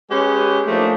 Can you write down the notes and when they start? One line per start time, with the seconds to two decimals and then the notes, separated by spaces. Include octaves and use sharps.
0.10 G#3 C#4 G4 G#4 B4
0.66 F3 A3 A#3 D4 D#4